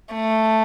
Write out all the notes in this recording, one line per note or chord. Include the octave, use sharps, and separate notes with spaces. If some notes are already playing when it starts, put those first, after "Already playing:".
A3